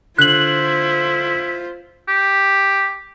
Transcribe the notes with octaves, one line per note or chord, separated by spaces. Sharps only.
D3 E4 F4 C5 F#6 F#7
G4